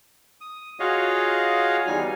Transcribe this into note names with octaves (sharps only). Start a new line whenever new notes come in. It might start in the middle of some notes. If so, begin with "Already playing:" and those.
D#6
F4 F#4 G#4 C#5 D#5 F5
E2 G3 D#4 G#5